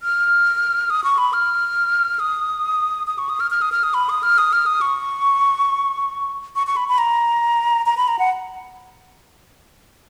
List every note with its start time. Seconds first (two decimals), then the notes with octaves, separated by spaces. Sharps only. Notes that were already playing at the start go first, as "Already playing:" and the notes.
0.02 F6
0.90 D#6
1.04 C#6
1.18 B5
1.33 F6
2.19 D#6
3.07 D#6
3.18 C#6
3.29 D#6
3.40 F6
3.51 F6
3.62 D#6
3.72 F6
3.83 D#6
3.94 B5
4.09 D#6
4.23 F6
4.38 D#6
4.53 F6
4.66 D#6
4.81 C#6
6.55 C#6
6.67 C#6
6.76 B5
6.88 B5
6.98 A#5
7.86 A#5
7.97 B5
8.08 A#5
8.19 F#5